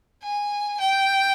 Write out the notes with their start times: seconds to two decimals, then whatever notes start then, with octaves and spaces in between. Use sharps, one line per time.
0.23 G#5
0.80 G5